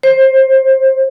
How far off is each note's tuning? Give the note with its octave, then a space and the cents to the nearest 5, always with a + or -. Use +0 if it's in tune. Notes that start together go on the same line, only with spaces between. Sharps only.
C5 +20